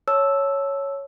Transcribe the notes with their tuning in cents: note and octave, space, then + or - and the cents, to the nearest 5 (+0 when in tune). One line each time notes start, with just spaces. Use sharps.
C#5 +0 A5 -5 E6 +0